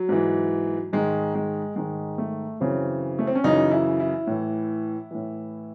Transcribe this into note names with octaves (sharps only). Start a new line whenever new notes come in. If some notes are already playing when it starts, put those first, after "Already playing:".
Already playing: F#3
G#2 E3
G#2 D#3 G#3
G#3
G#2 D#3 G#3
A3
F#2 C#3 E3 C4
A3
C4
C#4
F#2 C#3 E3 D#4
E4
E4
A2 E3
A2 E3